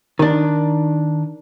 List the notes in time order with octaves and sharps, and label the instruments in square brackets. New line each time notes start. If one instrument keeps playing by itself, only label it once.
[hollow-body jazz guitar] D#3 D4